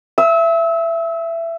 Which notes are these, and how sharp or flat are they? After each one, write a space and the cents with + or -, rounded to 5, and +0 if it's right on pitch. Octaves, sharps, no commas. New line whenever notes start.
E5 +20 E6 -35